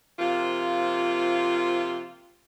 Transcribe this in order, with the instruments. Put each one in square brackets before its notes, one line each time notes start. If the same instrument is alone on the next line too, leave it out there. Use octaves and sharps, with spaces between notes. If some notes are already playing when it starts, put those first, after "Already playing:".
[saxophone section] C3 F3 A#3 F4